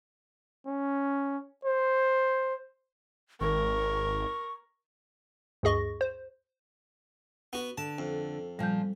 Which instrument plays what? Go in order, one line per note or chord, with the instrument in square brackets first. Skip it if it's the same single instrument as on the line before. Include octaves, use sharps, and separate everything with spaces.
[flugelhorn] C#4
C5
[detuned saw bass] G#1 [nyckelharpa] A#4 [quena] C#6
[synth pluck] D2 G2 G#4 D#5 C#6 A#6
C5
[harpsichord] B3 F#4
[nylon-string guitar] D3 [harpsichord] A5
[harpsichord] F2
[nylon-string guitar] A#2 F3 [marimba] G3 G6